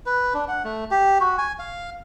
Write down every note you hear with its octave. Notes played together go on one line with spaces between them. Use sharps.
B4
D4
F#5
A3
G4
F#4
G#5
F5